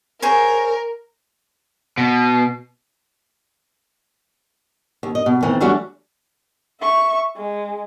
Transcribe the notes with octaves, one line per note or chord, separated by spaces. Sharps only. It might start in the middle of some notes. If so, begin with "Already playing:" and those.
G#4 A#4 C5 C#5
B2
D#2
D#5
B2
D#3 E3 A3 C4
E3 F#3 G3 A3 D4 F#4
E5 C#6
G#3